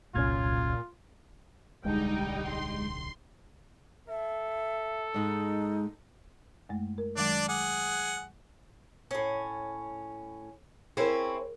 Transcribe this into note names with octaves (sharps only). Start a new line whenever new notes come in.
E1 C2 A#2 F#3 C#4 F4 F6 G#6
D1 B1 D3 G3 G#3 D#4 G5
C6
A4 E5
G#2 G#3 D#4
F#2 G#3 A3
A#4
D#3 F#3 G#3 D4 D5
G#4 F#5 D6
A2 C#4
C4 C#4 E4 G#4 A#4